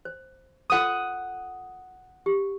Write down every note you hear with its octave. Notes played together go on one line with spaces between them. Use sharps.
C5
F4 A4 C5 F#5 D#6
G4